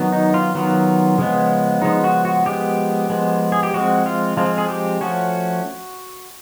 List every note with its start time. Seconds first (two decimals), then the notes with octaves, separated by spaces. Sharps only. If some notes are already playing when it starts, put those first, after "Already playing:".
Already playing: D#3 F#3 B3
0.12 D#4
0.34 F4
0.55 D#3 F#3 B3
1.18 C#3 F3 G#3 B3
1.82 C#3 F3 G#3 B3 D#4
2.04 F#4
2.25 F#4
2.46 F3 G#3 B3 G4
3.10 F3 G#3 B3
3.52 G#4
3.63 G4
3.74 F3 G#3 C4 F#4
4.06 F4
4.37 F3 G#3 C4 F4
4.58 G#4
4.69 G4
5.01 F3 A3 C#4 F#4